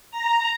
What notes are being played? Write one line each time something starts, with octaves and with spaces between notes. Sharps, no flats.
A#5